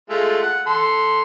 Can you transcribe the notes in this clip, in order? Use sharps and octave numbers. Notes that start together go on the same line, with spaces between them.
G#3 A3 F4
F#5
A4 C6